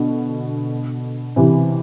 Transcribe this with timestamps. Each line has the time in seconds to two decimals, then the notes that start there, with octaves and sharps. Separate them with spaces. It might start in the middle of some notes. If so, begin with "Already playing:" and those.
Already playing: B2 D3
1.36 C3 E3